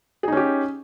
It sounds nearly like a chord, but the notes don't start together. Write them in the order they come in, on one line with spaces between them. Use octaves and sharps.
G#4 D#4 C#4 G4